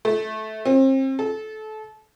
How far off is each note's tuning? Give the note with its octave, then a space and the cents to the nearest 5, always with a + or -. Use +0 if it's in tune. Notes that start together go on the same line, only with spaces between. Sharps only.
A3 -20
C4 +35
A4 -25